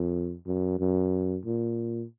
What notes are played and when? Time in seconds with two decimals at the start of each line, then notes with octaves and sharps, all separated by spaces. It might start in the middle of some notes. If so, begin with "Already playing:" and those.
Already playing: F2
0.47 F#2
0.79 F#2
1.45 A#2